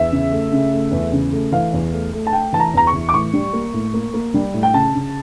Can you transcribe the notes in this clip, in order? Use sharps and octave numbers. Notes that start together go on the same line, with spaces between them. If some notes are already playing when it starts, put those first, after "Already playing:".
Already playing: E2 E5
C#3
A3
C#3
A3
E2
C#3
A3
E3 F5
E2
A3
A3
A5
A3 G5
E3 A5
A#5
E2 A#5
C#6
E3
D6
A2 C#6
G3
A#3
A2
A#3
A#3
G3
A2
G5
C#3 A5
C#3